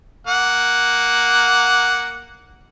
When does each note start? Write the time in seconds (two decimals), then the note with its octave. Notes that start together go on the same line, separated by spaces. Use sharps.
0.27 A#3 F#5